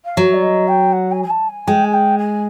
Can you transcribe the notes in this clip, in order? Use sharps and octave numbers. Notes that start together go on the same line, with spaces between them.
F5
F#3 E5
D5
D#5
G5
F#5
G#5
G#5
A5
G#5
G#3 G5
G#5
G5
G#5